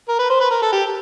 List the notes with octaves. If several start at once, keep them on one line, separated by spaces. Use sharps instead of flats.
A#4
B4
C5
B4
A#4
A4
G4